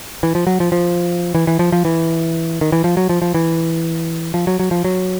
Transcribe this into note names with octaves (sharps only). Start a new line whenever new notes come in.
E3
F3
F#3
F3
F3
E3
E3
F3
F3
E3
D#3
E3
F3
F#3
F3
F3
E3
F3
F#3
F#3
F3
F#3